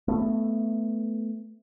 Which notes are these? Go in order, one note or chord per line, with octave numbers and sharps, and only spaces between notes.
A3 B3